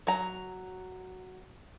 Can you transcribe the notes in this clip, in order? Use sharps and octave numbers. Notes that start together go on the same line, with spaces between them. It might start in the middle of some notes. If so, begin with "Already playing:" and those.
F#3 A#5